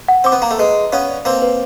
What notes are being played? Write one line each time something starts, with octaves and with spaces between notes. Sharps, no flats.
F#5
C4 D6
B3
A#3 A#5
A3
G#3 B4
B4
B3 C#4 F5
D5
A#3 C4 B4
B4